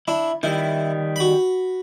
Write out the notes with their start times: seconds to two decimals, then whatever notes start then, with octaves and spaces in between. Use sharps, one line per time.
0.08 D4 E4
0.43 D#3 G3 E4
1.16 F#4 B5